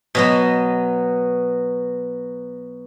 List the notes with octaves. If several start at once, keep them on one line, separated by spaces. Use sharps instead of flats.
B2 F#3 B3